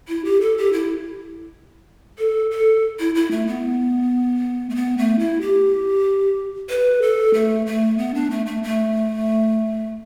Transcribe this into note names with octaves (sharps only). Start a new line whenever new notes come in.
E4
G4
A4
G4
E4
A4
A4
E4
E4
A3
B3
A3
B3
A3
E4
G4
B4
A4
A3
A3
B3
D4
A3
A3
A3